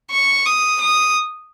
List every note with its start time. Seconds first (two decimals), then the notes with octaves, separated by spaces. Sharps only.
0.11 C#6
0.46 D#6
0.81 D#6